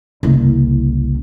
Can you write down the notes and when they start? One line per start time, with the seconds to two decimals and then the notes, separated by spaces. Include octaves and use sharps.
0.23 F#1 C2